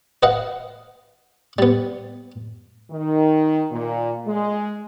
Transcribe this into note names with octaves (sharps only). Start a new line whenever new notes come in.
B4 D#5 F5 F#5
G3 B3
D#3
A#2
G#3